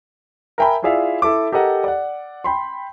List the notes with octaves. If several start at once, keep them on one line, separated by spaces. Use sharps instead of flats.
A#4 E5 G5 G#5 B5
E4 F4 G#4 D5 E5 F5
E4 A4 E5 D6
G4 A4 A#4 D#5 F#5
D5 F#5
G5 B5 C6